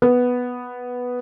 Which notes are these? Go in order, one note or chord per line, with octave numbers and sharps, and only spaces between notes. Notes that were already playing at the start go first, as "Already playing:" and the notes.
B3